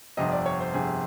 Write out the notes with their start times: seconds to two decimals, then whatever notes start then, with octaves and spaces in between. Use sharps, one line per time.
0.17 G1 F2 C3 D#5
0.32 D5
0.46 C#5
0.60 C5
0.74 G1 F2 C3 G#4